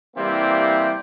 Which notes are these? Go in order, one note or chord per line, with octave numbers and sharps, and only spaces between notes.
C3 E3 G3 A#3 C4 E4